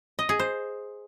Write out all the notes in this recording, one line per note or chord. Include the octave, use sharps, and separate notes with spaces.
D#5
G#4
C5